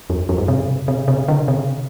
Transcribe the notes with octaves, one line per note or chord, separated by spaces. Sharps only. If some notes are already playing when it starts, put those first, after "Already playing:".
F2
F2
G2
C3
C3
C3
D3
C3